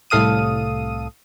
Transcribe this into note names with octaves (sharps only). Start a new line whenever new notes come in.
C2 A2 A4 F5 D#6 D#7